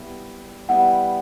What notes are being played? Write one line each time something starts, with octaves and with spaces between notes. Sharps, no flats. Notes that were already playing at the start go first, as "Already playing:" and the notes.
Already playing: G3 B3 E4
G3 B3 E4 F#5